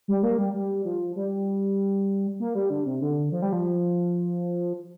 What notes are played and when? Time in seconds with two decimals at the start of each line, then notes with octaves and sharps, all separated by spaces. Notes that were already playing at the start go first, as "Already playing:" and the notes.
0.08 G3
0.23 A#3
0.38 G3
0.54 G3
0.85 F3
1.16 G3
2.40 A#3
2.55 G3
2.70 D3
2.86 C3
3.01 D3
3.32 F3
3.42 G3
3.53 F3